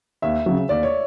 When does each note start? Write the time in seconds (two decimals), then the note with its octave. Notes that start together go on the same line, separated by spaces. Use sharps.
0.22 D#2 E5
0.46 C#3 F#3
0.69 D#2 D5
0.83 C#5